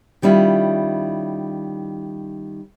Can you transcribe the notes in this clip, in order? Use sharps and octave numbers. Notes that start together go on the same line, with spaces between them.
D#3 G3 C#4 E4 F4